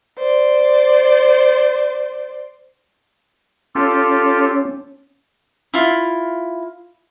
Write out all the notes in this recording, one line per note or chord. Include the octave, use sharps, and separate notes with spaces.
C5 D5
C#4 F4 G4 A4
E4 F4